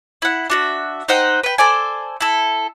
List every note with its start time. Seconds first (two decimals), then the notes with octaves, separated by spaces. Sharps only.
0.22 E4 F#5
0.50 D4 F#4 E5
1.08 D#4 C5 F#5 G5
1.43 B4 G5
1.58 A4 C5 D5 G#5
2.20 E4 A4